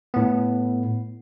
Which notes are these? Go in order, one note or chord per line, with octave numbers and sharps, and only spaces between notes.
A2 B3